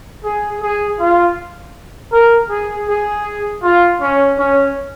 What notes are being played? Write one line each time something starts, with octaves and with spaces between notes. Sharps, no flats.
G#4
G#4
F4
A#4
G#4
G#4
F4
C#4
C#4